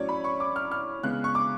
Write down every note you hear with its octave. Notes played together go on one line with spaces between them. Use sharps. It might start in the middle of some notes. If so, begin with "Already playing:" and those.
Already playing: A2 F#3 C#4 C#5 D5
B5
C#6
D6
F6
F6
C#3 G#3 B3 F#6
C#6
D6